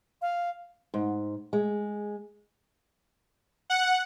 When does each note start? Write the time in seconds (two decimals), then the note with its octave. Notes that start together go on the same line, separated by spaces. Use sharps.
0.22 F5
0.94 G#2
1.53 G#3
3.70 F#5